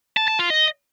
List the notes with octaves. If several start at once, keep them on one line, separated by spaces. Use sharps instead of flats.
A5
A5
F4
D#5